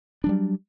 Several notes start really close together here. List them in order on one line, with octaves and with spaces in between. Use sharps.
D4 F#3 G3